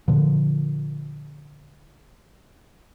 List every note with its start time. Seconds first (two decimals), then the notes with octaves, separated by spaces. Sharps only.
0.08 A#2 D3 F3